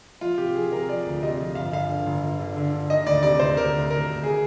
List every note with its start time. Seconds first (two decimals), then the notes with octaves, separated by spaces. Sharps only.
0.21 F3 F4
0.38 C3 G4
0.54 F3 G#4
0.72 C3 A#4
0.89 F3 D5
1.06 D2
1.23 C3 D#5
1.40 F3
1.55 G1 F5
1.72 G1 F5
1.90 D3
2.06 G1
2.23 G1
2.39 D3
2.57 D3
2.73 D3
2.90 D#3 D#5
3.06 D2 D5
3.23 C3 D5
3.39 D2 C5
3.57 D2 A#4
3.74 D2
3.90 D2 A#4
4.07 D2
4.23 G#4